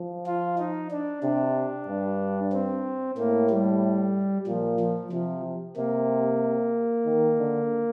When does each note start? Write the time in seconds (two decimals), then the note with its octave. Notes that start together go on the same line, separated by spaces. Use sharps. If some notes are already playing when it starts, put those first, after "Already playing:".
Already playing: F3
0.26 F4
0.58 D#4
0.91 D4
1.23 C3 D4
1.88 G2
2.53 C4
3.17 A2 A#3
3.50 G3
4.47 A#2 F3
4.80 F3
5.12 C3 F3
5.76 C3 A#3
7.06 D#3
7.39 D3